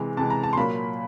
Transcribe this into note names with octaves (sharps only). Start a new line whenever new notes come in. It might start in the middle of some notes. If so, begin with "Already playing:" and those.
Already playing: C3 E3 G#3
C3 E3 G#3 A5
A#5
A5
C6
A#2 F#3 A#3 B5